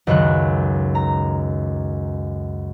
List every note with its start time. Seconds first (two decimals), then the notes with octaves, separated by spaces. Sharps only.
0.07 C#2 F#2 D#3 F#6
0.95 A#5